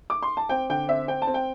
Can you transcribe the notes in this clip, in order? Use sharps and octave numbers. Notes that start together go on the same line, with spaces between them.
D6
C6
A5
C4 G5
D3 G5
C4 E5
C4 G5
A5
C4
G5